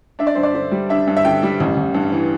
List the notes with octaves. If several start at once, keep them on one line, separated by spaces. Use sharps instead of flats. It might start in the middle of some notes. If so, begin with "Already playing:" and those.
D4 E5
D5
G2 C5
D5
D3 C5
G3
D4 E5
G2
E5
D3 G5
G3
A1
A1
G2
E3